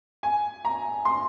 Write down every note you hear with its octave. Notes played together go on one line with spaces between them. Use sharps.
G#5
A#5
C6